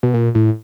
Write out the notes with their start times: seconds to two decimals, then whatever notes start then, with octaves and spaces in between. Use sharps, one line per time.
0.03 B2
0.14 A#2
0.35 A2